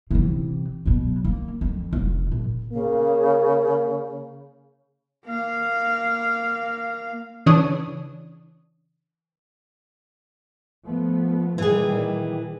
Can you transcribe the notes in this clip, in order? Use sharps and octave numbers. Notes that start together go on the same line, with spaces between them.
C3 E3
B2 F#3
A#3
F2
F1
A#1
C#3 A#3
A#3 F5
C#3 E3 D4 C#5 D#6
F3 A3 B3
A#2 D#3 E3 G3 G#4